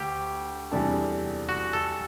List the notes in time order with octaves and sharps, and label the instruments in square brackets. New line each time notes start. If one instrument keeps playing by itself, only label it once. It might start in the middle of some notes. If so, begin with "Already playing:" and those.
Already playing: [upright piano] D2 A3 [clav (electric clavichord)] G4
[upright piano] E2 C3 G3 D4 A4
[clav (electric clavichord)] F#4
A4